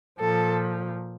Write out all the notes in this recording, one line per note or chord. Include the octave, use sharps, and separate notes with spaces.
A#2 F3 A4